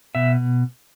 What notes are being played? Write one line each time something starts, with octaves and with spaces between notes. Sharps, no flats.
B2 E5